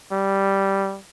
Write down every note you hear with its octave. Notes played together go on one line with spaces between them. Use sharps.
G3